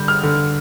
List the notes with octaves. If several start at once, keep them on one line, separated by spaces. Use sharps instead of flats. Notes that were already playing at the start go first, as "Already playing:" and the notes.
Already playing: D3 G3 G6
F6
D3